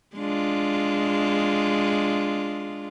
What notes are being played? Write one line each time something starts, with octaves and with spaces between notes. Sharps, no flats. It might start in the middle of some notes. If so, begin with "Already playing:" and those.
G#3 D4 F4